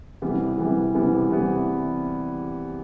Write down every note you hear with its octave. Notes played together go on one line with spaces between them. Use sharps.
C3 E3 G3 B3
C3 E3 G3 B3
C3 E3 G3 B3
C3 E3 G3 B3